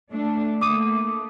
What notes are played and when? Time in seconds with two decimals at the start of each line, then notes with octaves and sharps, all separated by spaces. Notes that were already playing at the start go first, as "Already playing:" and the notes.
0.11 A3 D4
0.61 A3 A#3 D6 D#6 D#7